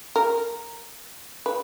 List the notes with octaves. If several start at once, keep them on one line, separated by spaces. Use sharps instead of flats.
A#4
B4